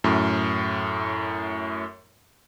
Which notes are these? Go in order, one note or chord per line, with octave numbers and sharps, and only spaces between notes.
F#2 A2